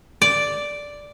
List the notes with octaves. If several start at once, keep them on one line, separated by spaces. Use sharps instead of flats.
D5